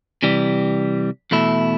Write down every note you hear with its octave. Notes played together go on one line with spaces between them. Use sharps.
C3 E3 G3
E2 B2 A3 E4